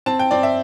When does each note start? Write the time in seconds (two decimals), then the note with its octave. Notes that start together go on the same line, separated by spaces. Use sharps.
0.06 C4 A5
0.19 G5
0.31 C4 D5
0.43 E5